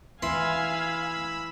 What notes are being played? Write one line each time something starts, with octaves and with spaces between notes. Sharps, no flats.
E3 E4 F5 G#5 B5 C6 E6